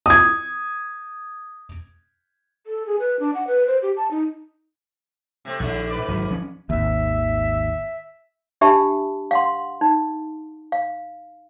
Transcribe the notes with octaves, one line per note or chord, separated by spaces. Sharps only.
D#6 G#6
A4
G#4
B4
D4
F#5
B4
C5
G4
A5
D#4
C3 A3 C4
A#1 D#2 D3 A3
G#2 B4 D5
G#1 F#3
F3 C#4
G#1 D#2 E5
D4 G4 E5 A5 B5
F5 F#5 C6
D#4
F5